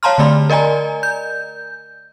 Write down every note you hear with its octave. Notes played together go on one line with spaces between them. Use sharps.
C#5 F5 A5 A#5 C6 F6
D3 A3 D5 B5 C6
A#4 D5 D#5 G#5 A#5
G6